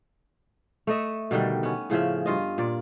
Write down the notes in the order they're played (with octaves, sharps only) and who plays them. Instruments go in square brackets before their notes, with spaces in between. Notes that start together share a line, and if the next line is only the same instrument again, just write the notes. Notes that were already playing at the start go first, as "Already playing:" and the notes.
[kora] A3 A4 D#5 E5
B2 D3 D#3 G3
B3 C#4
A2 C#3 F3 E5
G2 F4 D#5
A#2 D5